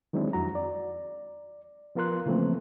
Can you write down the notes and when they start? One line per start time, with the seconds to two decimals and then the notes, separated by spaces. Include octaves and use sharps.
0.13 D#3 F#3 G#3 C4 D4 E4
0.33 F2 F#4 A#5
0.55 D5
1.95 F3 B3 F4 A#4 C6 F#6
2.26 C#3 E3 F3 A3 A#3 C4